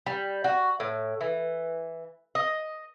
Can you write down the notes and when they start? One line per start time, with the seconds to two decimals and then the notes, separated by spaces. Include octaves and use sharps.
0.06 G3
0.44 F#4
0.80 A2
1.21 E3
2.35 D#5